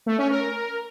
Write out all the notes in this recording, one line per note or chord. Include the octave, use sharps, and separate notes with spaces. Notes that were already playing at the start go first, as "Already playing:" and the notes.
A3
C#4
A#4